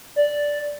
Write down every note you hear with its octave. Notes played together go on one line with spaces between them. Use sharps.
D5